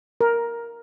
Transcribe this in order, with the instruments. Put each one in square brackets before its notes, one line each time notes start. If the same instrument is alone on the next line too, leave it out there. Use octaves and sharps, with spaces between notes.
[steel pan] A#4